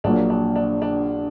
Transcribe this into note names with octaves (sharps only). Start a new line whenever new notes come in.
A#1 A#2 F#3 A#3 D4
D4
D4
D4